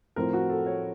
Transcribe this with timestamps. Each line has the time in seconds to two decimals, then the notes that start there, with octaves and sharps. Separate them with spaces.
0.16 A2 F3 C4 A#4
0.33 F#4
0.50 A4
0.66 C#5